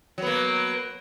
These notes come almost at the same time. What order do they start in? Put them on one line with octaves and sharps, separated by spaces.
F#3 B3 A#3